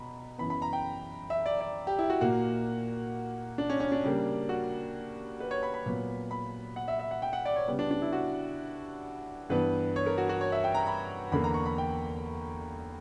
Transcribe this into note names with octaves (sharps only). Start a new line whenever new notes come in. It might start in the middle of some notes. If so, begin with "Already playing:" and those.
Already playing: B2 A#5 B5
F#2 E3 B3 B5
B5
A#5
G5
E5
D5
D5
G4
E4
F#4
A#2 A#3 F#4
D4
C#4
C#4
D4
C#3 G3 A#3
F#4
B4
C#5
B5
B5
A#2 F#3 B3
B5
F#5
E5
E5
F#5
G5
F#5
D5
C#5
C#3 G3 B3
D4
D4
E4
F#4
G2 E3 B3 B4
C#5
A#4
F#4
F#4
C#5
E5
G5
A#5
B5
E2 D3 A#3 B5
A#5
C#6
B5
G5